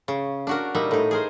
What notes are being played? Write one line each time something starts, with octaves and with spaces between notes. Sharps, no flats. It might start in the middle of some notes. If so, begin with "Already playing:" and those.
C#3
D4 F#4 A#4
A#2 G3 D#4 E5
A2 D#4
G#4 A#4 C5